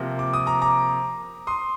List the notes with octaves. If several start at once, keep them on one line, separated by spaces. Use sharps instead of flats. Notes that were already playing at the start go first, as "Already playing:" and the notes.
Already playing: C3 F3 A#3
D6
D#6
A#5 D6
A#5 D6
C6 D#6